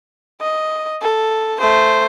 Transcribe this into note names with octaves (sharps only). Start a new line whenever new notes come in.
D#5
A4
A3 C5